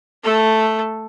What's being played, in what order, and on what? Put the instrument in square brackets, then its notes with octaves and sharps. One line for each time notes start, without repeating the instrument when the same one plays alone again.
[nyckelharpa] A3 A4